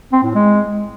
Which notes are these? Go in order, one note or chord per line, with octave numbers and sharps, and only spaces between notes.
C4
A2
G#3